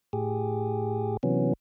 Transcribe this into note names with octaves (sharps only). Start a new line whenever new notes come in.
A2 G4 G#4
C3 E3 F#3 B3 C#4